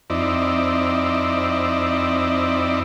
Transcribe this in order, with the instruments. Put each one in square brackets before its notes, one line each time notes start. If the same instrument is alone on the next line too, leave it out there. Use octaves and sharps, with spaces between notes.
[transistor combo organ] F2 C4 D#4 E4 D5